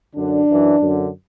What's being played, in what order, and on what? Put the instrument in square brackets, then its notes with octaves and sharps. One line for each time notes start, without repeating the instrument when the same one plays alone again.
[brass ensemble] F#2 D3 D4
F#2 E3
F#2 D3